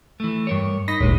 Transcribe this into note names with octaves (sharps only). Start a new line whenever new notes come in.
E3 A3
G2 A#4 C#5
D#4 B5 A#6 B6
G#1 D2 A#2 G#3